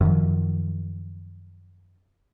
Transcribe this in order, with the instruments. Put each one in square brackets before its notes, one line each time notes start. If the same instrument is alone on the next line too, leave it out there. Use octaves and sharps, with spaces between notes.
[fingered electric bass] F#2 D#3 F3